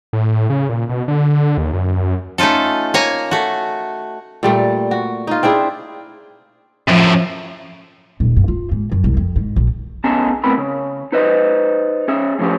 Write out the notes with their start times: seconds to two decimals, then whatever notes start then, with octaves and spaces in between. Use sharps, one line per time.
0.13 A2
0.50 C#3
0.69 A#2
0.89 B2
1.08 D3
1.58 D#2
1.73 F#2
2.38 A3 C#4 D#4 F4 A4
2.94 A#3 C#5 G#5 A#5
3.31 A3 F#4
4.43 A#2 G3 A3
4.91 F#4
5.27 D#4 F4
5.43 C4 D4 E4 G#4
6.88 F#2 A2 F3
8.20 D#1
8.36 G2
8.48 F4
8.71 G#2
8.92 F#2
9.04 C2
9.17 F2
9.36 G#2
9.56 A#1
10.04 B3 C#4 D#4 G#4 A5 A#5
10.44 A2 B3 C4 A#4 B5
10.58 C#3
11.12 D#4 B4 C5 D#5
12.08 C#4 G#4 E5
12.39 A2 F3 C#4 G4